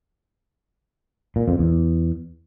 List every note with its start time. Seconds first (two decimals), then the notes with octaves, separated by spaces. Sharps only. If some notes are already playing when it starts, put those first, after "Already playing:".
1.36 A#2
1.48 F2
1.59 E2